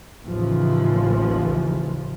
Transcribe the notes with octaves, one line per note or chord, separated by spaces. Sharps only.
A1 D#2 C#3 E3 F3